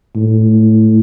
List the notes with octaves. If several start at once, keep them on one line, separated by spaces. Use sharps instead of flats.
A2